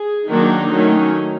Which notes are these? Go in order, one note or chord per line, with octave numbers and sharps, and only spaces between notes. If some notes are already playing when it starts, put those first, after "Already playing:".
Already playing: G#4
D#3 F#3 A#3 D4 D#4
D#3 F#3 A3 C#4